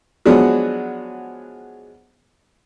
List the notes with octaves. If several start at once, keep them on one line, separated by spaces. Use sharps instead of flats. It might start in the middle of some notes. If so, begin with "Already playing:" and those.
F3 F#3 G#3 B3 D4 F#4